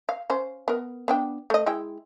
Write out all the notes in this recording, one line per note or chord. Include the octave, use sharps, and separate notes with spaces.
F5
C#4 C5
B3 A#4
B3 D4 G5
A3 D#5
G#3 E4 G5